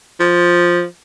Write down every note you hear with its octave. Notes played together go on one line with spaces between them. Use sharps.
F3